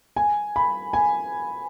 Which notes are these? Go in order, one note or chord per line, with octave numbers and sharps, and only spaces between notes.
G#5
B5
G#5